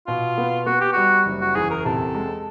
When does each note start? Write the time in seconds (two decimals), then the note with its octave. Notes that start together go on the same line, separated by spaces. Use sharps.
0.07 B2 F4
0.38 B3
0.66 B3 F#4
0.81 G4
0.93 G3 F#4
1.26 F#1
1.41 F#4
1.55 E2 G#4
1.71 A#4
1.85 C3 A4
2.15 G#3